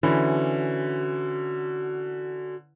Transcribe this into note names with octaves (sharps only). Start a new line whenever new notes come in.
D3 E3 C#4 F#4